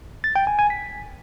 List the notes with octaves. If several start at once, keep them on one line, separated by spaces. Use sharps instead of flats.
A6
G5
G#5
G#5
B6